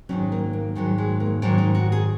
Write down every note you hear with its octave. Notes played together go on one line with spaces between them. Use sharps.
G#2 D#3 F#3 C#4
A#3
A#3
G#2 D#3 F#3 G#3
G#3
A#3
G#2 D#3 F#3 C#4
D#4
F#4
G#4